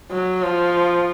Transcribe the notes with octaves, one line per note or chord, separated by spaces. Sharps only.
F#3
F3